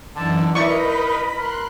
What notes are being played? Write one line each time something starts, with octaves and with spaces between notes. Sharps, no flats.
F#2 D3 E3 D#4 A5
D#4 E4 A#4 B4 D5 D#5 B5 C#6
A#4 C6 F#6